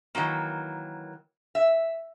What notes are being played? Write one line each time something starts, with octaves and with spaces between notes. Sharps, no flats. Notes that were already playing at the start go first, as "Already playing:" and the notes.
D#3 E3 F#3 A#3
E5